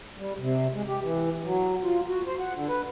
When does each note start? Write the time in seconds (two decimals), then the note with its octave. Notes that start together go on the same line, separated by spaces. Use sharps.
0.18 G3
0.39 C3
0.73 G#3
0.88 G4
1.03 E3
1.44 F#3
1.84 F4
2.08 F#4
2.27 C5
2.40 F#5
2.53 D3
2.68 B4